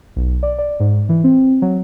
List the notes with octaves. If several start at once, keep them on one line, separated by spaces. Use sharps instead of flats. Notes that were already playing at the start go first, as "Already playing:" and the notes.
B1
D5
D5
G#2
E3
C4
F#3